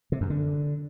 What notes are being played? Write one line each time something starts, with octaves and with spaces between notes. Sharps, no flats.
C3
F#2
D3